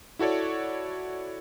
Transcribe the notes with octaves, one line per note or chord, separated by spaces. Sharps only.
E4 F#4 A4 C#5 D5